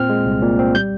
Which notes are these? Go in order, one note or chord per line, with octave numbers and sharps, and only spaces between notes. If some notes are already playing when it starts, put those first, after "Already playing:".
Already playing: A#2 C4 F6
G#3
C2
A#2
C4
G3 G6